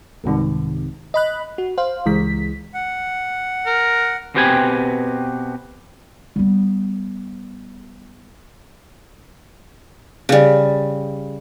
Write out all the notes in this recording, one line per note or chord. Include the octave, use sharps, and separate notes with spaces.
C2 G#2 C3 D#3
D#5 B5 F#6
F#4
C5 F5
C#2 E3 G#3 B6
F#5
A#4
B2 C4 G4 B4 G#5
G3 B3
C#3 G3